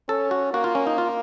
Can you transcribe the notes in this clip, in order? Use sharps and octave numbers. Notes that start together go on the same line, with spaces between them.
C#4 A4
F#4
A#3 F#4
F4
C#4
D#4
F4